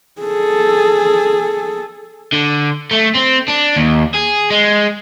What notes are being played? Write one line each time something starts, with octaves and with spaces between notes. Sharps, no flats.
G#4 A4
D3
A3
C4
D4
D#2
G#4
G#3